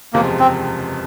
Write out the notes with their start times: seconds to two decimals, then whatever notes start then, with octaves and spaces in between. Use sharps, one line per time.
0.13 F#1 E2 C3 F3 G#3 A#3
0.40 C4